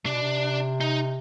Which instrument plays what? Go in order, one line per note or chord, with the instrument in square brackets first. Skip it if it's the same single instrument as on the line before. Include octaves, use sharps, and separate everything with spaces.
[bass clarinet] C3 [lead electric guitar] D4
[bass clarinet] B2
C3
[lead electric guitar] D#4